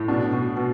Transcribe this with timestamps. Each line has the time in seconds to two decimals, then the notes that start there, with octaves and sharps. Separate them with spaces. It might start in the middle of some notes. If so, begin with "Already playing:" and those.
Already playing: A2
0.08 B2 D4
0.33 B2
0.57 B2